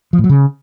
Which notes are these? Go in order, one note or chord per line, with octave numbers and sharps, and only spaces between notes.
F3
A2
F#3
C#3